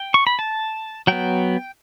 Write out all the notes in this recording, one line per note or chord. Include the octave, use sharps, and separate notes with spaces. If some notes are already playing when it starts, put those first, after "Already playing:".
Already playing: G5
C#6
B5
A5
F#3 B3 G5